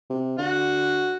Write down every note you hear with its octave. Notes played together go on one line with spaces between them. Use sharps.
C3
D3 F#4